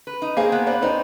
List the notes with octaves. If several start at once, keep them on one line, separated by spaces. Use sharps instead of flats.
B4
D#4
A#3 C4 G#4
B3
C4 D4 B4
C4 D4 D#4